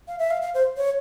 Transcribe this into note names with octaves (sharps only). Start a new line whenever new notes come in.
F5
E5
F5
F5
C5
C#5